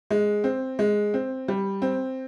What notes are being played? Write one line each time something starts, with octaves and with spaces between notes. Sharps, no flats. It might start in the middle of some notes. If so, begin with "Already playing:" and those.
G#3
C4
G#3
C4
G3
C4